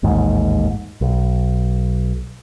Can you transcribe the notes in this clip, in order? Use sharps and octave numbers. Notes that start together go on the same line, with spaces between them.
A1 D#2 G#2
B1